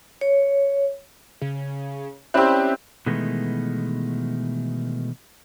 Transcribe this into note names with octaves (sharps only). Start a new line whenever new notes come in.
C#5
C#3
G3 C4 C#4 E4 G4 C5 C#5 F#6
B2 D#3 E3 G#3 A3 B3